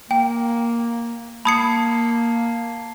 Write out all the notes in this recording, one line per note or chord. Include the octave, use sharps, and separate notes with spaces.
A#3 G5
A#3 A5 B5 D#6 G#6 C7 C#7